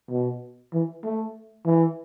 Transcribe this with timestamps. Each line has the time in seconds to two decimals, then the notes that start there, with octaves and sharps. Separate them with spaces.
0.10 B2
0.73 E3
1.04 A3
1.66 E3